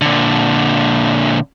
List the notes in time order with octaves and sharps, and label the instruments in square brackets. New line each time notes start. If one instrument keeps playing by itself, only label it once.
[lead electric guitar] A#2 D3